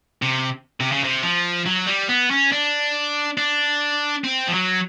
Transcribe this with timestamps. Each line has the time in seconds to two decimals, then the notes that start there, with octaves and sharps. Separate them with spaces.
0.22 C3
0.80 C3
0.92 C#3
1.04 C3
1.23 F3
1.66 F#3
1.87 G3
2.09 B3
2.31 C#4
2.52 D4
3.38 D4
4.24 C4
4.48 F3
4.53 F#3